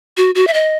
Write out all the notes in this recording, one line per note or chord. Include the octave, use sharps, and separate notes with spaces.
F#4
F#4
E5
D#5